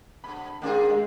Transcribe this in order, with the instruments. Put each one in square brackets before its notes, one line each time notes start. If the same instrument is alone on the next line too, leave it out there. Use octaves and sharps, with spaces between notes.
[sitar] B2 D3 [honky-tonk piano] B5
[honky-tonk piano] D#3 D4 [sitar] A#3 C4 G#4
[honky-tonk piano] G#3